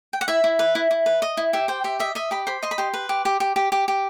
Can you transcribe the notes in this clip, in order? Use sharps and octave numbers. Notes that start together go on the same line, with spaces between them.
G5
F#5
E4 E5
E4
B4
E4
E4
B4
D#5
E4
G4 E5
C5 G5
G4 E5
D#5 E5
D#5 E5
G4 B5
C5 B5
D#5 C6
B5
G4 C6
B4
G4
G4
G4
G4
G4
G4